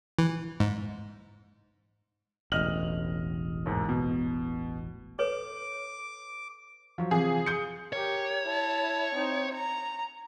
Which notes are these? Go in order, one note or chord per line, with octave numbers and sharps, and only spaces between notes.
E3
G#2
E1 A1 D#5 F6 F#7
D#2 G#2
B2
A4 B4 C#5 D6
F3 F#3
C3 E3 F3 G#4
D#6 G6 C#7
G4 A#4 C#5
E4 A5
C4 D#4
A#5